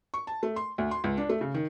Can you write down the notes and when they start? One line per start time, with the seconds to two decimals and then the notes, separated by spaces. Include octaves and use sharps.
0.14 C#6
0.27 A5
0.43 A3
0.56 C6
0.78 D2
0.91 C6
1.04 C#2
1.17 D4
1.29 A3
1.41 C#3
1.54 D#3